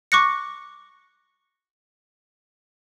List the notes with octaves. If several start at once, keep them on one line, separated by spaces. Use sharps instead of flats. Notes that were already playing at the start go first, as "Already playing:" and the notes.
C#6 D6 F#6 A#6 C#7